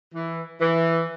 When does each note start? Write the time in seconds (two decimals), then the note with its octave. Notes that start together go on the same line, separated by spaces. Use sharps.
0.14 E3
0.61 E3